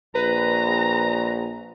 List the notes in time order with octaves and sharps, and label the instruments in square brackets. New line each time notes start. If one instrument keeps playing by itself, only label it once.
[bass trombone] A#1 [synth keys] B4 [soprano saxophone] A#5